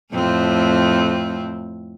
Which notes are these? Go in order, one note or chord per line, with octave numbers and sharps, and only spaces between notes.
F2 A2 C4